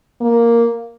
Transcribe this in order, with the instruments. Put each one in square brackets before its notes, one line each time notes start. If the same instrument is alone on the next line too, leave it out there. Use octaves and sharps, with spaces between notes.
[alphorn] A#3